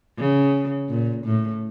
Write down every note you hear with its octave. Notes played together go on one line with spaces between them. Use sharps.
C#3
A#2
A2